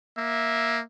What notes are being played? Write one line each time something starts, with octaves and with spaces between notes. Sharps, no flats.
A#3 E5